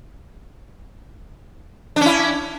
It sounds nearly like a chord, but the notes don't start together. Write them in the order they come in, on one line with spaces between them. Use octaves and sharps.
D4 C#4 E4